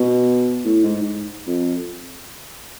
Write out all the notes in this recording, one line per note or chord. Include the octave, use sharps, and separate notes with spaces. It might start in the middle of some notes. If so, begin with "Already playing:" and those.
Already playing: B2
A2
G#2
G#2
F2